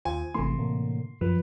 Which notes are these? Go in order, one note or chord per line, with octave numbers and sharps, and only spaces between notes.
D#2 F4 C5 G#5
G#1 C3 E3 A3 C6
A2 D3 A#3
F#2 F3 B4